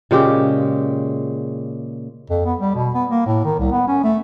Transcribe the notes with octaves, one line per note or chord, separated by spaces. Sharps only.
A#2 C#3 G#3 G4
F2
B3
G3
B2
B3
A#3
A2
D#3
C2
B3
C#4
A3